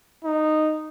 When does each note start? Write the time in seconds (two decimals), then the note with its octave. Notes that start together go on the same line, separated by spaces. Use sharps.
0.24 D#4